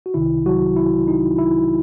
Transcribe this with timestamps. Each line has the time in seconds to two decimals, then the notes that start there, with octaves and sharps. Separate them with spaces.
0.06 F#4
0.14 C2 C3 D#3 E4
0.46 F#3 F#4
0.76 E4
1.08 D#4
1.38 E4